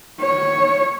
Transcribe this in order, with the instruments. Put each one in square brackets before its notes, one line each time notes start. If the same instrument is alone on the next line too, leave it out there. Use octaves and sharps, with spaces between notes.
[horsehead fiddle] C#5